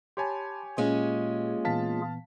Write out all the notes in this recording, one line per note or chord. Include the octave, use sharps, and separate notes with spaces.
G4 C#5 G#5 A5 B5 C6
A#2 G#3 A#3 C#4 F4 G#4
A#2 E3 B3 F5 A5 B6